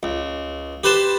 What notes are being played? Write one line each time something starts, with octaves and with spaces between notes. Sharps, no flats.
C#2
G4 B4 C5 A5